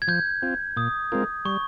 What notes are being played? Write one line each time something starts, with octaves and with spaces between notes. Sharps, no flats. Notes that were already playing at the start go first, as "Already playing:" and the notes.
G#6
F3 G6
C4 F4
A#2 D#6
G#3 C4 F4 A#4
G3 C#6